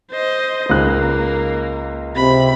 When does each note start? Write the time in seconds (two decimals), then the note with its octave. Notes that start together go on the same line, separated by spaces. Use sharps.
0.11 C5 D#5
0.70 C#2 A#3 D#4 F#6
2.16 C3 B5